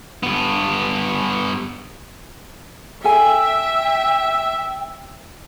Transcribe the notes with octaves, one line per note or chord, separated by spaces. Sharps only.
G2 B3
A4 E5 G5 G#5